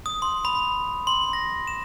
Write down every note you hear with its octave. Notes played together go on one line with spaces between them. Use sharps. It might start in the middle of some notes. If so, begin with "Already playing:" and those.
D#6
C6
B5
C6
A#6
E7